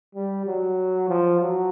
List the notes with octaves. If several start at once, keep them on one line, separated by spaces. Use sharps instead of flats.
G3
F#3
F3
F#3